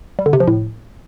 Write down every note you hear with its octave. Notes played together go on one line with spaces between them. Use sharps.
G3
D3
C3
F3
A2